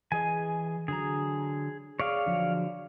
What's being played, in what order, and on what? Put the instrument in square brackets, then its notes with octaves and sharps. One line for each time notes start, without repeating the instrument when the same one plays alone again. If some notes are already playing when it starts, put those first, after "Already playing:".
[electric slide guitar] E3 G#4 D#5 [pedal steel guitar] G#5
[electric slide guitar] D3 F#3 A#5 [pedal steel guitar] G#4
[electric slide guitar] G#4 [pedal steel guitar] C#5 D5 F5
[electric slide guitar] D3 F3 F#3